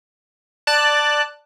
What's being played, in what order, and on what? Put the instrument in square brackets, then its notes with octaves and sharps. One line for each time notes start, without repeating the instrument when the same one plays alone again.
[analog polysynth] D5 A5 F#6